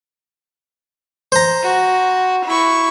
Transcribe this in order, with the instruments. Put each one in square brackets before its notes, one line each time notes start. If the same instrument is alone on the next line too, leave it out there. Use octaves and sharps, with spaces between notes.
[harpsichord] C5 A#5
[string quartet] F#4
E4 C#6